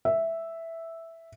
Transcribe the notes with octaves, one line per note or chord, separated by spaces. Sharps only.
E5